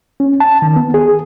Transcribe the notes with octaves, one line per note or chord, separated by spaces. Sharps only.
C#4
A5
D#3
B3
G#4